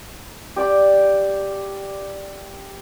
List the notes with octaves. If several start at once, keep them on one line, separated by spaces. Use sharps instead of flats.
G4 D5 G5 D6